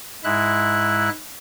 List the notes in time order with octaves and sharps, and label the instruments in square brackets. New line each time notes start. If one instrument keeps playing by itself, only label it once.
[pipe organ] G#2 G#3 E4 E5 F#6